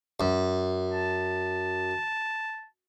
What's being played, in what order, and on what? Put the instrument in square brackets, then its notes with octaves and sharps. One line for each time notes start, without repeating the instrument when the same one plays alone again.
[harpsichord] F#2
[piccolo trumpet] A5